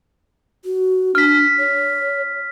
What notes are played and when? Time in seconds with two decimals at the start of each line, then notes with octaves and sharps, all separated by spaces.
0.65 F#4
1.15 D4 F6 B6
1.59 C#5